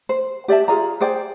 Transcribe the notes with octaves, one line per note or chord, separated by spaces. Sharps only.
C5
G4 D5 E5 A5
F4 G#4 D5 A#5
G#4 C5 D5 G5